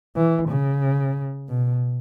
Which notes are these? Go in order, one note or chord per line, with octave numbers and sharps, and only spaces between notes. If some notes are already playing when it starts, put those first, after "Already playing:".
E3
C#3
B2